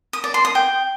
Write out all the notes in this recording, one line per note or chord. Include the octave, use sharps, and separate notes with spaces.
D#6
D5
C6
D#6
G5